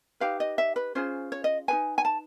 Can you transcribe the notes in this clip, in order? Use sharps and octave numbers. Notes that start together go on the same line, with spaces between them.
D#4 G4 B4 F5
D#5
E5
B4
C#4 F4 G#4 C5
C#5
D#5
D#4 G#4 B4 G#5
G#5
A5